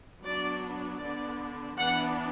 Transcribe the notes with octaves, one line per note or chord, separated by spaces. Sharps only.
F#3 B3 D4 D5
D3 B3 D4 D5
E3 B3 D4 F#5